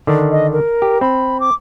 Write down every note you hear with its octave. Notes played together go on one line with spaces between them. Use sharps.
D3 D#3 D4
D#5
A#4
G4
C4 B5
D6